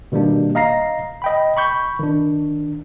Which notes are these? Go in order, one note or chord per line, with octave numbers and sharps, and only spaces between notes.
B2 D#3 G3 A#3 D4
D#5 F5 A#5 A#6 C7
D#5 G5 B5
B5 C#6 G6
D#3 D4